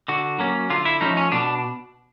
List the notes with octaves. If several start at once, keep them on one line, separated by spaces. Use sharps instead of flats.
D3 F#4
F#3 A#3 C#4
D3 F4
E4
F3 A3 C#4 D#4
C#4
B2 D4